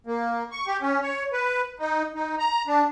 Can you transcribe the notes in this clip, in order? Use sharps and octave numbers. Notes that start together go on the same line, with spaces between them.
A#3
C#6
G4
C#4
C#5
B4
D#4
D#4
A#5
D4